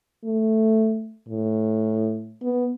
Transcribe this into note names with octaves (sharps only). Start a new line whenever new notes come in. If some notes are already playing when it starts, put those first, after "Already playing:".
A3
A2
B3